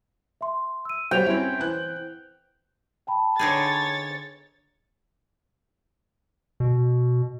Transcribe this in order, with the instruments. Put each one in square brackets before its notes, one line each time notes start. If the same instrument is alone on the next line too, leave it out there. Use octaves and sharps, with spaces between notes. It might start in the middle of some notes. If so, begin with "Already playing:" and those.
[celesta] E5 C6
E6 D#7
[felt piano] F#3 G3 [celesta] C5 F7 [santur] G5
[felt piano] C4 C#4 E4
E3 F#6
[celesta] G5 A5 B5
[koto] D3 D#4 G#4 [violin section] C#5 A6
[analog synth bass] B2